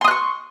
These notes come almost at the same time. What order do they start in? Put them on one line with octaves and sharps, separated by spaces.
C6 D#6 F#6 C#6